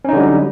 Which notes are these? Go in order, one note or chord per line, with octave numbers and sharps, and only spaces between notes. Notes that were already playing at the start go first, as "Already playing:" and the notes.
D3 F#3 G3 C#4 D#4